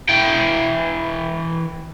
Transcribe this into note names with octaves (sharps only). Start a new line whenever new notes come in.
E3 G5